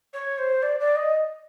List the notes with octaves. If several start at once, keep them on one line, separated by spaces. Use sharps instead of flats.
C#5
C5
D5
D5
D#5